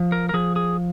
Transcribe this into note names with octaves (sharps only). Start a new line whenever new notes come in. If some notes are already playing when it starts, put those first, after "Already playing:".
Already playing: F3
A#4
A#4
F3 G#4
G#4